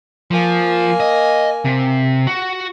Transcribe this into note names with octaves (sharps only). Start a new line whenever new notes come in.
F3 A#3 G#5
D#5
C3
F#4